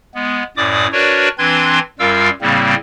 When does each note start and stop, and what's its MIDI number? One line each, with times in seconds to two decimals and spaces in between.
0.15 0.43 56
0.15 0.43 59
0.57 0.87 42
0.57 0.87 45
0.57 0.87 74
0.57 0.87 86
0.57 0.87 87
0.92 1.28 62
0.92 1.28 66
0.92 1.28 70
0.92 1.28 71
0.92 1.28 73
0.92 1.28 74
1.38 1.79 52
1.38 1.79 60
1.38 1.79 62
1.38 1.79 71
1.38 1.79 84
1.38 1.79 92
1.99 2.29 42
1.99 2.29 55
1.99 2.29 65
1.99 2.29 70
1.99 2.29 77
1.99 2.29 88
2.41 2.75 45
2.41 2.75 49
2.41 2.75 55
2.41 2.75 58
2.41 2.75 60